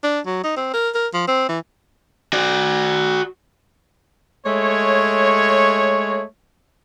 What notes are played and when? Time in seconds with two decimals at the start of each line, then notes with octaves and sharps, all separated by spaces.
0.03 D4
0.26 F#3
0.44 D#4
0.56 C4
0.73 A#4
0.95 A#4
1.14 F3
1.28 C4
1.49 E3
2.33 F#4 D5
4.46 G#3 A3 C#5